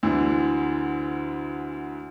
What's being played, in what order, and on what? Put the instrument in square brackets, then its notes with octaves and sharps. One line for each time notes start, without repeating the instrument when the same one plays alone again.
[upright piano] D2 D3 E3